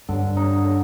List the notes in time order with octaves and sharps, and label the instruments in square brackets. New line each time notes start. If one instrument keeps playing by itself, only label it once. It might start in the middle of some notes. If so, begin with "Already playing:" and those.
[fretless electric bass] G2 [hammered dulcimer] D3
[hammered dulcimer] D#4
D3